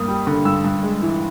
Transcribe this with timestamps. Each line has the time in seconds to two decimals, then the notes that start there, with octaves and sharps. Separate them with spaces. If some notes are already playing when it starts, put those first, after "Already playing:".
Already playing: G2 A#3 D#6
0.08 G3
0.27 D3
0.45 G2 E6
0.64 G2
0.83 G#3
1.02 E3